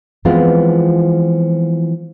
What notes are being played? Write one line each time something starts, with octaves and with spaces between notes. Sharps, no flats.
E3 F3 G#3 B3 C4 F4